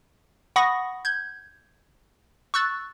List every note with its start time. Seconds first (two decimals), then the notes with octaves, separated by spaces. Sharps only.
0.56 F#5 B5 C#6 D#6 A#6
1.05 G6 G#6
2.54 C#6 E6 F#6 A6